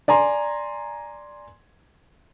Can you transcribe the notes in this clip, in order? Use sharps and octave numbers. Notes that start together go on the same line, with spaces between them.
D5 G#5 A#5 C6